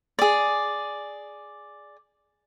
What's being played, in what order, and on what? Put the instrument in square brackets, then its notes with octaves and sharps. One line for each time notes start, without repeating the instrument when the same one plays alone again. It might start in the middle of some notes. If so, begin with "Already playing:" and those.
[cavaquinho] G#4 D5